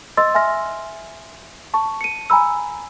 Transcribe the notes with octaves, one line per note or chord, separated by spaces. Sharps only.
D#5 C6 E6 A6
E5 G#5 C6 F6 A#6
A5 C#6
C#7 D#7
G#5 A#5 B5 E6